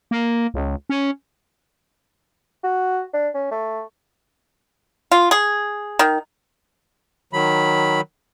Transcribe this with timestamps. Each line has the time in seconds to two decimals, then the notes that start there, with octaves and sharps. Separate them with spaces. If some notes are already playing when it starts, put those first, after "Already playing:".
0.11 A#3
0.54 C#2
0.90 C#4
2.63 F#4
3.13 D4
3.34 C#4
3.51 A3
5.11 F4
5.31 G#4
5.99 D#3
7.33 D#3 F#3 B5